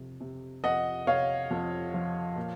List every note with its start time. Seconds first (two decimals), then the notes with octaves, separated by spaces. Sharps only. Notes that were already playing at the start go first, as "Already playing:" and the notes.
Already playing: F2 C3
0.21 C3
0.64 F2 D#5 F#5
1.07 C3 C#5 F5
1.51 F2
1.94 F3
2.36 A#2